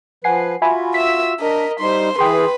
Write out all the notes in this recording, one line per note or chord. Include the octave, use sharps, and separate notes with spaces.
F3 B4 F#5 G#5 C7
F4 F#4 E5 G#5 B5
E5 E6 B6
D4 A#4 D#5
G3 D#4 C5 C6
E3 G#4 B4 G5 C6